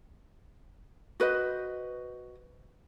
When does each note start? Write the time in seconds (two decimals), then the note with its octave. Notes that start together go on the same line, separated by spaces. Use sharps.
1.20 F#4 B4 C5 D#5